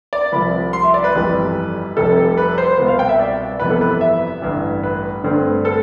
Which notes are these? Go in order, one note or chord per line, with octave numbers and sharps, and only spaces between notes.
D5
C2 C3 F3 B5
C6
E5
D5
B4
G1 F2 E3 G3
F1 F2 C3 G3 A4
B4
C5
C2 B2 B3 C5
F5
G5
E5
D5
G1 F2 C3 E3 B3 B4
A4
B4
E5
A1 G2 D3
B4
G2 D3 A3 C4
A4